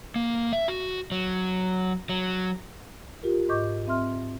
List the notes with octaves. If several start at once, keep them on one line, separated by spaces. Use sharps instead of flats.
A#3
E5
F#4
F#3
F#3
F4 G4 A#4
G#2 D#5 C#6 D6 G6
C4 E5 C6 F6